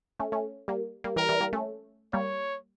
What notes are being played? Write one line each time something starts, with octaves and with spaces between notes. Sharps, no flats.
A3 C#4
A3 C#4
G3 A#3
G3 A#3
E3 G3 A#4
E3 G3
G3 A#3
A3 C#4
G3 A#3 C#5